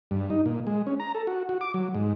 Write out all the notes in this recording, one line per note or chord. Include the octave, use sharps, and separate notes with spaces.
G2
D#4
A#2
G#3
C#4
A#5
A4
F#4
F#4
D6
F#3
G#2